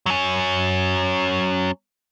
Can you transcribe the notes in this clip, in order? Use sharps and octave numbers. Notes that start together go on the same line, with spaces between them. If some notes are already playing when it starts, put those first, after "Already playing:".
F#3 C#4